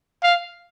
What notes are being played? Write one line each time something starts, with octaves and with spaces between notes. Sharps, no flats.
F5